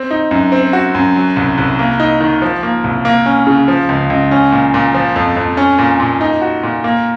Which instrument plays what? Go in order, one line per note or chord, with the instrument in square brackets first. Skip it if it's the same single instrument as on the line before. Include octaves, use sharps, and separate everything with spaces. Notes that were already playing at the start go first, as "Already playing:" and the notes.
Already playing: [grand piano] C4
D#4
F#2
C4
F#4
F#2
F#3
C2
C2
A#3
D#4
D#3
F3
A#3
C2
A#3
C#4
C#3
F3
C#2
C#2
C#4
A#2
A#2
F3
F2
F2
C#4
A#2
A#2
D#4
F#4
A#2
A#3